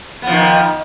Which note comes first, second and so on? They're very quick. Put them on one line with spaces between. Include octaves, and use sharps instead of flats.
B3 F3 D#3